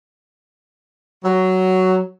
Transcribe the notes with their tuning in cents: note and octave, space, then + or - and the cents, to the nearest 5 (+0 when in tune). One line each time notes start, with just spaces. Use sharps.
F#3 +10